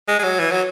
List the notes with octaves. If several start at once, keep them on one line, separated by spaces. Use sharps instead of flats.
G#3
G#3
F#3
E3
F#3